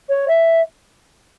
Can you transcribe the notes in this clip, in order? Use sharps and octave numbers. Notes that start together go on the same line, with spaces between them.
C#5
E5